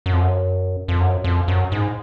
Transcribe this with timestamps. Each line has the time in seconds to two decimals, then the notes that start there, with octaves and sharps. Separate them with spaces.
0.06 F#2
0.13 F2
0.21 F#2
0.88 F2
1.00 F#2
1.24 F2
1.48 F#2
1.72 G#2